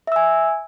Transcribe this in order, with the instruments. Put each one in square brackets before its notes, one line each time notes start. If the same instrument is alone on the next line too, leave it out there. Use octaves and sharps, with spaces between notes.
[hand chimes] E5
E6
G#5